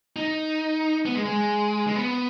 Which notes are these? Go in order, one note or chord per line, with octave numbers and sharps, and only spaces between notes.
D#4
B3
G#3
G#3
G#3
B3